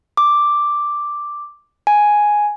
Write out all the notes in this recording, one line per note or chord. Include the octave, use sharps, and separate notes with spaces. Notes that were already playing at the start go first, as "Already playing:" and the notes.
D6
G#5